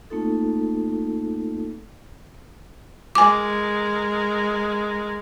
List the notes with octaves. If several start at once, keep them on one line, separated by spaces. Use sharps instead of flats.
A3 A#3 C4 D#4 F4 A4
G#3 A#4 G#5 D6